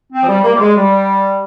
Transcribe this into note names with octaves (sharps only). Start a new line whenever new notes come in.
C4
F3
G3
A#3
G3
G#3
G3